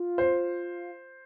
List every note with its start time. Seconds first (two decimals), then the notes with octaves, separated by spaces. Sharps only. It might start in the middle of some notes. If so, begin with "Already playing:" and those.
Already playing: F4
0.18 C5